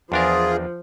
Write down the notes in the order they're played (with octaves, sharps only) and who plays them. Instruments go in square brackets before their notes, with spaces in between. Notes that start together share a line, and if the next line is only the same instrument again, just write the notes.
[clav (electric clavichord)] E2 D4 A#4 [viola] F3 [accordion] F4 G#4